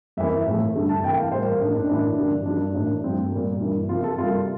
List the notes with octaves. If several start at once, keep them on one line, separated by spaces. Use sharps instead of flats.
F2 E3 A#3 E5
A2 F3 A3
G2 D3 A3
A5
C3 E3 A#3 G5
F5
A2 G3 A#3 C5
A#4
A2 F3 A#3 D4
D4
A2 E3 A#3 D4
G2 D3 G3 A#3
G2 F3 A#3 D4
A2 E3 A#3 D4
G2 F3 A3 C4
A#2 G3 A#3
G2 E3 A#3
C3 F3 A#3 F4
A4
C3 G3 A#3 F4